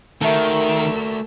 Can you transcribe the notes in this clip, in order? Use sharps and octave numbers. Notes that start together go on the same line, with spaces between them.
D#3 A3 F#4 A#4 E5 A5 E6